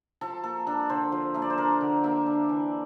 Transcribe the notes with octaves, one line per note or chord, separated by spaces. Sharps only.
F3 A4
A#3 A4
D4 A4
D3 C5
F3
A#3 E5
D5
C5
D4 A#4
D3
A#3 E5
D4
E3